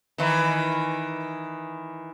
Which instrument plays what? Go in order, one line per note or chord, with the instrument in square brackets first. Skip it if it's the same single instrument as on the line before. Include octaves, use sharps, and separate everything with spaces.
[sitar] D#3 E3